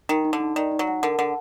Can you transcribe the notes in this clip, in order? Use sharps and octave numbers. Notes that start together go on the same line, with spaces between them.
D#3 D#4
D#4
D3
D#4
D#3 D5
D#4
F#3
F#5
D3 A#4
D3 F#5